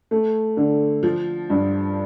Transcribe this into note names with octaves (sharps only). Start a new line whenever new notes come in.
A3
D3
F3
G2